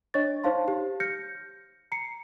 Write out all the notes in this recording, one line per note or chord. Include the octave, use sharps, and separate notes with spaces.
D4 C#5 D#5 C#6 A6
D#4 C5 C#5 F5 A5 C6
G4
F6 G6 A#6 C#7
A#5 C7 C#7